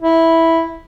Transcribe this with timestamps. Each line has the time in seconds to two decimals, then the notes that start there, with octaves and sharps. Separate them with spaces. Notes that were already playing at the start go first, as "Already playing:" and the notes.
0.02 E4